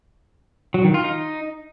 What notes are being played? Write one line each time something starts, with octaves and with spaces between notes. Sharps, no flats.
F#3
D#3
F4
D#4